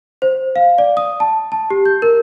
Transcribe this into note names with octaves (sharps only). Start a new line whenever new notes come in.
C5
F5
D5
D#6
A5
A5
G4
G6
A#4